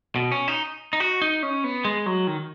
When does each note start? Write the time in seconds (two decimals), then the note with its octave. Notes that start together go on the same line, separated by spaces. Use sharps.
0.16 B2
0.32 C#4
0.48 D#4
0.93 D#4
1.00 F#4
1.22 D#4
1.43 C#4
1.64 B3
1.85 G#3
2.06 F#3
2.27 D#3